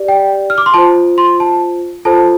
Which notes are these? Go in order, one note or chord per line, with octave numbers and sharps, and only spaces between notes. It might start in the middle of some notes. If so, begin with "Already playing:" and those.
Already playing: G4 D5
G5
F6
D6
C6
F4 C5 A5
C6
A5
F4 A4 C5 A5